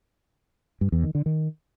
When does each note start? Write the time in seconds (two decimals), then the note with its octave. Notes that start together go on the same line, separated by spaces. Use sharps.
0.81 G2
0.92 E2
1.04 D#3
1.15 D3
1.26 D#3